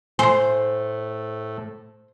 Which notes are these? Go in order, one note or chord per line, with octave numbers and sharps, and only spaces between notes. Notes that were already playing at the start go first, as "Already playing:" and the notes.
A2 C5 G#5 C6